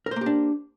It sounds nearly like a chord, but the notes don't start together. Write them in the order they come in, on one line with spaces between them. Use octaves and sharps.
A#4 C5 A#3 G4 D4